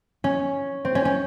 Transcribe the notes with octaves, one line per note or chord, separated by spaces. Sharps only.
C#4
C4
C#4
C#4